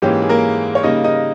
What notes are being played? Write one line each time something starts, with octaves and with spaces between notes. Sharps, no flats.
G#2 E3 A#3 C#4 G4
G#4
A#3 A#4
C#5
C#3 G3 A#3 D#4 D#5
D#4 D#5